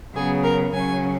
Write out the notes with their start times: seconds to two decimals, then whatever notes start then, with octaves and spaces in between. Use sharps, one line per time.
0.15 C#3 F#3 B3 G#4
0.43 A#4
0.73 C#3 F#3 C#4 G#5